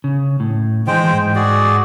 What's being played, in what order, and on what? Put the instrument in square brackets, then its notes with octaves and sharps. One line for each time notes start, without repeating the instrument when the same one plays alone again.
[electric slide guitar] C#3
A2
[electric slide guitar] D#3 E3 [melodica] G#3 C5 G5
[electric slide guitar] G#2
[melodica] F#4 G#4 D5